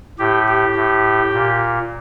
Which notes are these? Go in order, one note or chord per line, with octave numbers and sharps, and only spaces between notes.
A2 G4
G4
A2
A#2